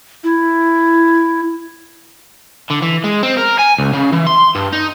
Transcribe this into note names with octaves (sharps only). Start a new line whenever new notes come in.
E4
D3
E3
G#3
C4
A#4
G#5
C#2
C#3
E3
C6
G2
D#4